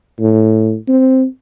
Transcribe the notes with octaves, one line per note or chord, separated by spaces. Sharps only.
A2
C4